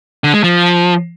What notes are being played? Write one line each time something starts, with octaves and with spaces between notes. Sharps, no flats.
D3
G#3
F3